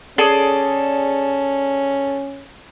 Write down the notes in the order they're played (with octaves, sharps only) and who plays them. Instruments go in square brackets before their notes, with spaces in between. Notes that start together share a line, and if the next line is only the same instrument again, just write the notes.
[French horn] C#4 [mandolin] G#4 A4 D5